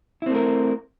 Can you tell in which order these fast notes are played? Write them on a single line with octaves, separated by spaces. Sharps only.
E4 C4 A3 A#4